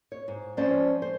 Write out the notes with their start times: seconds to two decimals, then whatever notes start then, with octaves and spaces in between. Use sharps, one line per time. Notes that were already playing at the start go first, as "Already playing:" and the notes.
0.12 C#5
0.28 G#2
0.57 F3 G#3 C#4 C5 D5 A5
1.02 C5